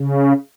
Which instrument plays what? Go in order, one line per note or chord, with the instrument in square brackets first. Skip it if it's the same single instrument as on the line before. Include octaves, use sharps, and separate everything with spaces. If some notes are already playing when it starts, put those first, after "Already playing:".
Already playing: [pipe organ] C#3